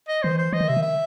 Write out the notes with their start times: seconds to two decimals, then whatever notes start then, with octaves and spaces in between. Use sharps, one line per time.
0.08 D#5
0.23 D#3 C5
0.31 E3
0.38 C5
0.53 E3 D#5
0.61 D#3
0.68 C3 E5
0.77 D#3
0.82 E5